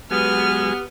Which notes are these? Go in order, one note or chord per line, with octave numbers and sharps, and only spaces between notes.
F#3 G#3 B3 G4 G#5 F6